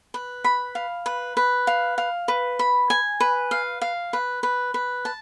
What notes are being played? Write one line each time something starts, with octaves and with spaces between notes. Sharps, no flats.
B4
B5
F5
B4
B4
F5
F5
B4
B5
G#5
B4
F5
F5
B4
B4
B4
A5